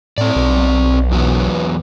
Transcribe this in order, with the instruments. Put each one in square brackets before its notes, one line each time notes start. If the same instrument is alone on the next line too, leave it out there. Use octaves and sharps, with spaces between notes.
[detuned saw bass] A2 [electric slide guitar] C4 D5
[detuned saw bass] B1
[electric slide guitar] E2 F#3 B3